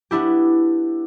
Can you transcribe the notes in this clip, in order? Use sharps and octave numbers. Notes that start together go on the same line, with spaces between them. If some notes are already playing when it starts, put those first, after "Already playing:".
B3 D4 E4 G4